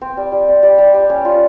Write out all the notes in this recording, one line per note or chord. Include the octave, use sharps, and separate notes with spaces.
C4
G3
G3
C4
G3
G3
G3
C#4
F4